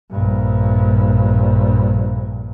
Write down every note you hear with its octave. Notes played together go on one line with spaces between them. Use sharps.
A#1 G2